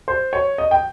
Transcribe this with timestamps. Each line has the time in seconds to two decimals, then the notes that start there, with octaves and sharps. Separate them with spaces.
0.08 C5
0.33 C#5
0.58 D#5
0.71 G5